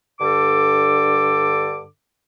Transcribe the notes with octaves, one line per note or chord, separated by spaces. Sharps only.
G2 D3 A4 D6